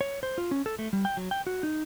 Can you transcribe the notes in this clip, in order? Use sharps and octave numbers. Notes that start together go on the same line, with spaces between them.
C#5
C5
F4
C#4
A4
A3
G3
G5
F#3
G5
F#4
D#4